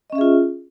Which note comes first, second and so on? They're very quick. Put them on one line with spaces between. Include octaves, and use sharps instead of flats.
D#5 C#4 E5 G#4 F4